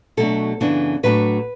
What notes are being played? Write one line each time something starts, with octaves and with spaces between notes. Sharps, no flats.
B2 F#3 A3 D4 A4
F#2 C#3 E3 B3 D4
A2 F#3 A3 D4 B4